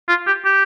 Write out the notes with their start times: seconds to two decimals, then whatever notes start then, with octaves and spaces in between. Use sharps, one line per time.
0.08 F4
0.26 G4
0.45 G4